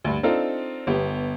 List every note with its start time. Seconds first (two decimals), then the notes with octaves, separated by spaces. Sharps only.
0.04 D2 G2
0.23 C4 D4 D#4 F4 A4
0.87 G1 B3 G4